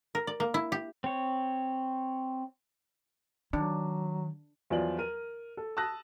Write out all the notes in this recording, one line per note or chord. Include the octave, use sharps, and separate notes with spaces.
A#4
D5
A#3
E4
G4
C4 C#5
D#3 F#3 D4
E2 F3 F#3 F4 D5 F#7
A#4 D#7
A4
A5 D#6 E6 F#6 A#6